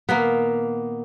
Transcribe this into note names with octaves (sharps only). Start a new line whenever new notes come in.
A#2 D#3 A#3 B3 B5